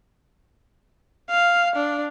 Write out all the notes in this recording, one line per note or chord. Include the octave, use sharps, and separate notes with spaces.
F5
D4